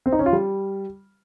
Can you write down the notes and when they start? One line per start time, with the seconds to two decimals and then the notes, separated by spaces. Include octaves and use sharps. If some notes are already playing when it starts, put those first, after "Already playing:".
0.06 C4
0.12 D#4
0.19 C#4
0.26 F4
0.33 G3